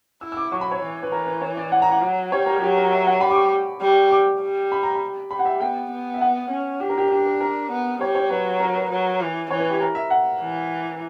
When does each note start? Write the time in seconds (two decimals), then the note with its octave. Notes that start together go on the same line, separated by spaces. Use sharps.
0.21 E4 E6
0.32 E6
0.37 D6
0.52 F#3 C#6
0.61 B5
0.71 C#5
0.82 E3
1.03 B4
1.12 E3 A#4
1.27 B4
1.41 C#5
1.57 D5
1.72 F#5
1.82 A#5
1.92 F#5
2.01 F#3
2.32 G3 C#5
2.46 A#4
2.62 F#3 G4
2.77 A#4
2.91 E5
3.07 F#5
3.21 G3 B5
3.30 D6
3.36 C#6
3.81 G3
4.11 D6
4.41 G3
4.72 B5
4.83 A#5
4.95 B5
5.31 G3 B5
5.39 F#5
5.45 E5
5.60 B3 G5
5.91 B3
6.14 E5
6.21 F#5
6.50 C#4
6.80 D4 G4
6.89 A#4
6.98 G4
7.11 D4 G4
7.26 A#4
7.41 A#4
7.71 B3
8.01 G3 C#5
8.15 C#5
8.30 F#3 B4
8.60 A#4
8.75 B4
8.90 F#3
9.21 E3
9.50 E3 C#5
9.60 B4
9.70 G4
9.81 A#4
9.95 E5
10.10 F#5
10.41 E3